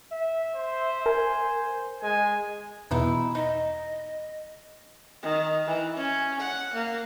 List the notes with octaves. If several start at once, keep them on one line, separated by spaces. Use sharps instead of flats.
E5
C5
A#4 G#5
G#3 G#5
E2 B2 E3 D#4 E4
D#4 D#5
D#3
E3
C#4
F#5
A#3